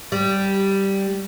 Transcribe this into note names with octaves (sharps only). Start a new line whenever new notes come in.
G3